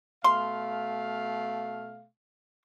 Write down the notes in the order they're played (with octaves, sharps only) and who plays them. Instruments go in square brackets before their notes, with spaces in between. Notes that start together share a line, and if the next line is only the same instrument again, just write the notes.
[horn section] B2 A3 F5 [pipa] C6